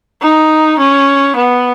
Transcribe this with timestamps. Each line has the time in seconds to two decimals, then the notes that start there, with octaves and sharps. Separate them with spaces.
0.22 D#4
0.79 C#4
1.36 B3